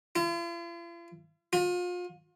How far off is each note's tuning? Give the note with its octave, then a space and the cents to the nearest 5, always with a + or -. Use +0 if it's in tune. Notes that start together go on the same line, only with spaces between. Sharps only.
F4 -45
F4 +35